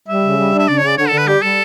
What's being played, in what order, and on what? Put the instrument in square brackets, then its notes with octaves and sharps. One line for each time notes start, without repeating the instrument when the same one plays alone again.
[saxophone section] G3 [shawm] E5
[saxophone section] C#3
G3
D4
[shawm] E5
[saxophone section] C#3 [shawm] D5
[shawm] C#5
[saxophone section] C#3
[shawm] D5
[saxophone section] D3 [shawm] C#5
[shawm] A4
[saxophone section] D3
[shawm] B4
[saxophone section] G3 [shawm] G4
[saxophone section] G3 [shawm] A4